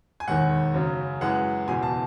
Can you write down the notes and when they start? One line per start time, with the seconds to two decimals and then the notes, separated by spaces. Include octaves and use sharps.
0.20 G#5
0.28 E1 D#2 D#3 F#5
0.74 F#2 C#3 F#3
1.21 F#2 E3 G#3 F#5
1.67 F#1 E2 B2 G#5
1.83 A5